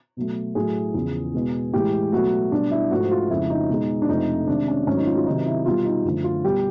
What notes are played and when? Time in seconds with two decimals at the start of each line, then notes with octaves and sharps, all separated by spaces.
0.17 B2 F#3 A3
0.55 A2 F#3 A3 G#4
0.94 E2 C#3 F3
1.34 B2 G#3
1.73 A2 E3 G#3 G4
2.12 B2 F#3 A3 F#4
2.52 B2 G3 D4
2.71 E4
2.91 G#2 F3 A3 F#4
3.11 F4
3.30 F2 C#3 F3 G#3 E4
3.50 D#4
3.70 B2 G#3
4.02 D4
4.08 F2 C3 F3 A3 D#4
4.47 C3 D#3 G#3 D4
4.68 C#4
4.87 G#2 D#3 F#3 A3 C#4
4.97 D#4
5.07 F4
5.17 F4
5.26 C3 D#3 F#3 D#4
5.46 E4
5.65 B2 G3 F4
5.85 D#4
6.04 F#2 D3 F3 A3
6.24 F4
6.44 B2 G3 G4